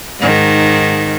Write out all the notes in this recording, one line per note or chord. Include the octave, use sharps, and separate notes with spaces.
G#2 D#3